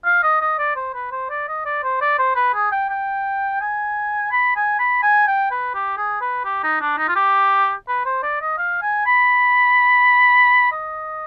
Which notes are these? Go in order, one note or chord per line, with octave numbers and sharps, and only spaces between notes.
F5
D#5
D#5
D5
C5
B4
C5
D5
D#5
D5
C5
D5
C5
B4
G#4
G5
G5
G#5
B5
G#5
B5
G#5
G5
B4
G4
G#4
B4
G4
D#4
D4
D#4
F4
G4
B4
C5
D5
D#5
F5
G#5
B5
D#5